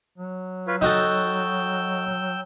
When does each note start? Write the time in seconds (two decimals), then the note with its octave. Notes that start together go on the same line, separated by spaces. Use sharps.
0.18 F#3
0.67 F4 B4 C#5
0.81 D#4 F#4 A4 G5 E6